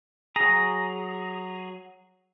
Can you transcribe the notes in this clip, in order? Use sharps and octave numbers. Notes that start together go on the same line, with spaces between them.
F#3 G#4 A#5